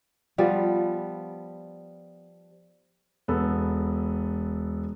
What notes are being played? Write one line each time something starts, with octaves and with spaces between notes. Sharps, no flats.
F3 G3 B3
E1 B3 A4